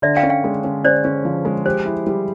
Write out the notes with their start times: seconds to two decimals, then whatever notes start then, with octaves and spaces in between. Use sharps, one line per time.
0.02 D3 D5 E5
0.17 F5 G5
0.23 C#4
0.29 F5 G5
0.44 G#3
0.64 C#4
0.84 C#4 C5 D5
1.04 C#4
1.25 F3
1.45 G#3
1.65 G4 C5
1.85 E4
2.07 G3